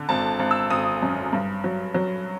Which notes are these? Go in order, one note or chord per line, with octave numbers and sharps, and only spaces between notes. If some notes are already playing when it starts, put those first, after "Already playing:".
Already playing: D3
G#1 A5
G#1
E6
G#1 D#6
F#2
G2
F#3
F#3